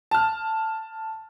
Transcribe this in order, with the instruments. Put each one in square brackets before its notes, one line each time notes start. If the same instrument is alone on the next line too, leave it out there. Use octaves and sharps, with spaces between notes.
[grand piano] A5 F6